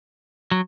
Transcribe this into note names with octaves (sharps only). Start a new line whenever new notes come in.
F#3